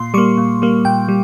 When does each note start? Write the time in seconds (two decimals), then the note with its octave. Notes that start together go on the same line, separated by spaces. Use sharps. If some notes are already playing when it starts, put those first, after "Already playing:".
Already playing: A#2 C6
0.14 G3 A#3 C#6
0.38 A#2
0.62 G3 A#3
0.85 A#2 G5
1.08 G3